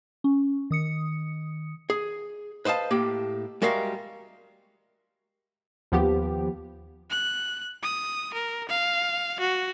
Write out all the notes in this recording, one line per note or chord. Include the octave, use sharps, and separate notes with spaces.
C#4
D#3 D#6 C#7
G#4
B4 C5 D#5 F5 A5
A2 A#3 G4
G3 G#3 F#4 A#4 E5 F5
D#2 F3 B3 G4
F#6
D#6
A#4
F5
F#4